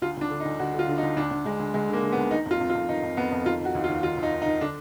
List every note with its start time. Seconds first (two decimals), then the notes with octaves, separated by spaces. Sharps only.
0.02 D2 F4
0.17 D2 D4
0.30 D3
0.40 D#4
0.45 D2
0.59 D2 F#4
0.73 D3
0.79 F4
0.88 D3
0.98 D#4
1.03 D2
1.16 D2 D4
1.31 D2
1.45 D2 G#3
1.60 D2
1.74 D2 G#3
1.89 D3 A#3
2.03 D3
2.12 B3
2.17 D2
2.31 D#3 D#4
2.46 F2 F4
2.61 F2
2.70 F4
2.75 F2
2.88 D#3 D#4
3.03 F2
3.17 F2 B3
3.32 F2
3.45 D#3 F4
3.61 D#3 F#4
3.75 D#2
3.84 F4
3.89 D#2
4.03 D#3 F4
4.17 D#2
4.23 D#4
4.31 D#3
4.42 D#4
4.46 D#3
4.61 D3 D4